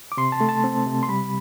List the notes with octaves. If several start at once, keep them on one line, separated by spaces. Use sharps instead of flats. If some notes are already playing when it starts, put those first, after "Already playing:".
D6
C3 C6
A5
A3
A5
C4
C3
C6
G3 B5